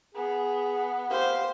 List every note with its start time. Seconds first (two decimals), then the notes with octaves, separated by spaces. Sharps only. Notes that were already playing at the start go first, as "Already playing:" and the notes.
0.15 B3 G#4
1.10 G4 C5 F5